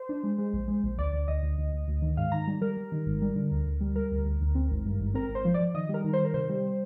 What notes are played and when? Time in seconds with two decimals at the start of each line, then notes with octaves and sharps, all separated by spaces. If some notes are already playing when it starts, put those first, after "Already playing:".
Already playing: C5
0.09 D4
0.23 G#3
0.38 G#3
0.53 A#1
0.68 G#3
0.84 A#1
0.98 D2 D5
1.13 D2
1.28 D2 D#5
1.43 D2
1.58 D2
1.73 D2
1.88 D2
2.02 D#3
2.17 G#2 F5
2.32 D#3 A#5
2.47 G3
2.61 G3 A#4
2.77 G3
2.92 D#3
3.06 G#1
3.22 G3
3.36 D3
3.51 D2
3.67 D2
3.81 G3
3.95 G3 A#4
4.11 D2
4.25 D2
4.41 D2
4.55 C4
4.70 G#1
4.85 G2
5.00 G#1
5.14 C4 A#4
5.29 G#1
5.35 C5
5.45 F3
5.54 D5
5.60 F3
5.74 D#3 D#5
5.89 G3 A#4
6.04 D#3
6.13 C5
6.18 D#3
6.25 A#4
6.34 C3 C5
6.49 G3